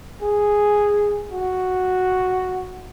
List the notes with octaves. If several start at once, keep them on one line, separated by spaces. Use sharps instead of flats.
G#4
F#4